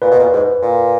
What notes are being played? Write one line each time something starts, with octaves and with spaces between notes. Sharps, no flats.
A#2 B4
B2
A#2
G#2
A#2